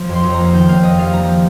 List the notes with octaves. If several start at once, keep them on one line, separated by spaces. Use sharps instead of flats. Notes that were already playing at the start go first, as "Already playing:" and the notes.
Already playing: F3
F2
C6
F2
A#5
A#3
D#3 G5
A#3 F5
F2 D#5
G3 F5
F3 A#5